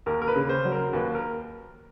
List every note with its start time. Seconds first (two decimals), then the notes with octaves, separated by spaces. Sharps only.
0.06 D#2 A#4
0.22 A#4
0.28 B4
0.36 C#3
0.49 C5
0.65 F#3
0.72 A#4
0.93 D#2 B4
1.15 A#4